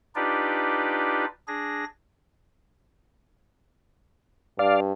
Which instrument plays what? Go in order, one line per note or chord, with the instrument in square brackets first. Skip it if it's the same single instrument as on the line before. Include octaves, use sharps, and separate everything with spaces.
[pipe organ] D4 D#4 F4 G4 B4 D5
D4 G#4 A#6
[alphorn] G2 [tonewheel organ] D5 F5